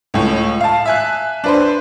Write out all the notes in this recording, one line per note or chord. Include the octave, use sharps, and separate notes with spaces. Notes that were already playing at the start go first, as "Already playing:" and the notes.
C#2 A2
F5 A5
E5 G#5 F#6
D4 B4 C5